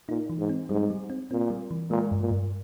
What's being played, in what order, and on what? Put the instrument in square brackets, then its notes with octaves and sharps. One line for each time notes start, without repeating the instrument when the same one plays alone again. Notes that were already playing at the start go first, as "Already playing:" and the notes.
[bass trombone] A#2 [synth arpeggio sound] D#4
[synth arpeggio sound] E3
[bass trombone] G#2
[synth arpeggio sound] C4
[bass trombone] G#2 [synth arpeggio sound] G3
[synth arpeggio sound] G3
C4
[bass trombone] A#2 [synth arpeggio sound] C4
[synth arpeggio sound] G3
E3
[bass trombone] A#2 [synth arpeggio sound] G#3
[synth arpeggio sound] G2
[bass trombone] A#2
[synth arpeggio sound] G2